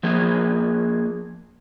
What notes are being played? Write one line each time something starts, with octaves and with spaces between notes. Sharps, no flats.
F3 A#3 G#4